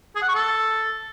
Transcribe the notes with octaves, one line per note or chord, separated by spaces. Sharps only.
G#4
F#5
C#6
A4